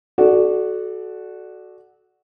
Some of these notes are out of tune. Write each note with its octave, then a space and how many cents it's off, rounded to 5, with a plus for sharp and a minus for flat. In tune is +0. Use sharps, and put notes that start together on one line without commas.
F#4 +0 A4 -30 D5 +10